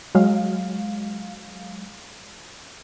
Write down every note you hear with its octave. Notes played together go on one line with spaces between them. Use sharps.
F#3 G#3 F5